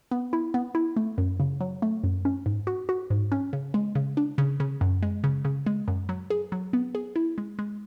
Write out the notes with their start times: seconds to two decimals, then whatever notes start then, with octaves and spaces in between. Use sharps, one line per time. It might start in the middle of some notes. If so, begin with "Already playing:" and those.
0.11 B3
0.33 E4
0.54 B3
0.75 E4
0.97 A3
1.18 F#2
1.40 C#3
1.60 F#3
1.82 A3
2.04 F#2
2.25 C#4
2.46 G#2
2.67 F#4
2.89 F#4
3.10 G#2
3.32 C#4
3.53 C#3
3.74 G#3
3.95 C#3
4.17 D4
4.38 C#3
4.60 C#3
4.81 F#2
5.02 G#3
5.24 C#3
5.45 C#3
5.66 G#3
5.88 F#2
6.09 F#3
6.30 G#4
6.52 F#3
6.73 B3
6.95 G#4
7.16 E4
7.38 G#3
7.59 G#3